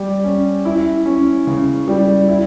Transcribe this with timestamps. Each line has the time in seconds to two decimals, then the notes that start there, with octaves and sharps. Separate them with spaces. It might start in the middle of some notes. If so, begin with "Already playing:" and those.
Already playing: G3 G4
0.24 C#4
0.65 E4
1.06 C#4
1.47 C#3
1.88 G3
2.29 E4